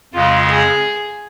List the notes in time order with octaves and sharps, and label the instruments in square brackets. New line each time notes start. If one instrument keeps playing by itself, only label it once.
[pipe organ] F2 C#3 G#3 [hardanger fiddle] F4
[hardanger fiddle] G#4